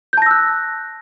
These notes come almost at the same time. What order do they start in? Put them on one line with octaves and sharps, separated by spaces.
G6 A5 A#6 E6 F#6